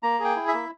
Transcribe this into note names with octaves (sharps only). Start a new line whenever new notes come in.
A#3 A#5
G#4
G5
E4
E5
A#3